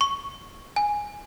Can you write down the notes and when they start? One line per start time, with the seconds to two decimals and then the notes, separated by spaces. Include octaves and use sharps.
0.01 C#6
0.76 G#5